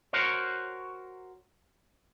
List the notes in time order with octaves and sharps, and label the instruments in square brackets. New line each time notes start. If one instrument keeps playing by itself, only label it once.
[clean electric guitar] F#4 A#4 C5 C#5